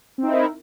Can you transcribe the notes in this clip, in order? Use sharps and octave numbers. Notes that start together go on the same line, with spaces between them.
C4 D#4 E4 A#4